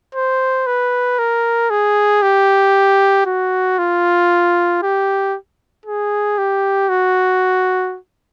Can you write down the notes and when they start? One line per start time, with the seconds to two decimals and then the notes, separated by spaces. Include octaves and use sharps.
0.15 C5
0.67 B4
1.19 A#4
1.70 G#4
2.23 G4
3.26 F#4
3.79 F4
4.83 G4
5.86 G#4
6.38 G4
6.89 F#4